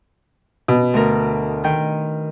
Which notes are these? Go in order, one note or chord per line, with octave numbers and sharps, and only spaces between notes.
B2
D2 A#4
D#3 G5